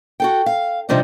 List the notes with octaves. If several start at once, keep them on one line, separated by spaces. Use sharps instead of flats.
F#4 A4 G5
F5
C3 D#3 F3 G3 D4 D#4